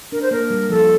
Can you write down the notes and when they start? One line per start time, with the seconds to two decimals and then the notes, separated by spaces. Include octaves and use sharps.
0.12 D4 A#4
0.22 C5
0.31 A#3 A#4
0.50 G3
0.70 F3 A4